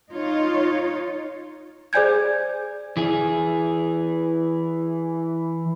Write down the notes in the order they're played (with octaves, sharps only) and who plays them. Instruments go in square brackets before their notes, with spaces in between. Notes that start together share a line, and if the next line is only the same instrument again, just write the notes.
[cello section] D#4 F4 C#5
[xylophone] G#4 C5 D5 G#5 G6 G#6
[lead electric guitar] E3 G#4